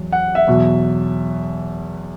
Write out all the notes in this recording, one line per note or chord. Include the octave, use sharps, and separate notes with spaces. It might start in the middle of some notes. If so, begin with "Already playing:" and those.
Already playing: E2 F#3
F#5
E5
E2 B2 F#3